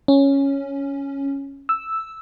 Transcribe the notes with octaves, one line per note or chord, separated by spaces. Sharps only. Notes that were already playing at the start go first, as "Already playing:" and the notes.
C#4
E6